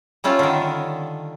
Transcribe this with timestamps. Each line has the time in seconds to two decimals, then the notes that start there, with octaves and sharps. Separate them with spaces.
0.24 G3 A3 C#4 F4
0.39 D3 D#3